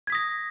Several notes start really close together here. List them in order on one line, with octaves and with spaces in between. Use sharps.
G#6 B6 D#6 A#6